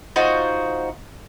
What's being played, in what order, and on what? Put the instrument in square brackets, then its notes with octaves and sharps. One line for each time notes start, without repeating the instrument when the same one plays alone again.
[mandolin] D#4 F4 F#4 C5